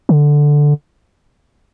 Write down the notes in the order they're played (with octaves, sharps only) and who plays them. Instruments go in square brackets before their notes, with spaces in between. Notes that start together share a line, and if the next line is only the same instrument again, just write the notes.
[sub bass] D3